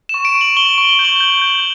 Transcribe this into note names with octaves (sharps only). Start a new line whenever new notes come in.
C#6 E7
D7
C#6
F#7
C#6 G7
C#6
G7
G6
F#7
G6
G6